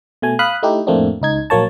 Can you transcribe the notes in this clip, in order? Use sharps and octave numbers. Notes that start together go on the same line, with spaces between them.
B2 A3 G#5
F5 B5 D#6 F#6
A3 D#4 E4 G4
F2 A2 A3 A#3 C4 D4
C#2 D#4 G#6
A#1 F#3 A#3 C#5 A5